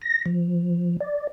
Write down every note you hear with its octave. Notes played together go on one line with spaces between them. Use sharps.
A#6
F3
D5